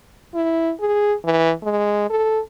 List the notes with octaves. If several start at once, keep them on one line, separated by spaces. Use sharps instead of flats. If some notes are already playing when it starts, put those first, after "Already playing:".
E4
G#4
E3
G#3
A4